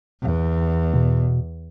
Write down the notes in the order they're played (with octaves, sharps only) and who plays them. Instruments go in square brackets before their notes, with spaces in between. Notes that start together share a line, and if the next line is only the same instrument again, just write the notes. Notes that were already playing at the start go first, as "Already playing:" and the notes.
[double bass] E2
[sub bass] B2